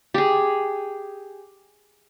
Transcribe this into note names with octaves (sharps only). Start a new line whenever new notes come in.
G4 G#4